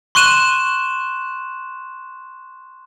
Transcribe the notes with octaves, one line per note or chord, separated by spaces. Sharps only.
C6 C#6 F#6 D#7 E7 F#7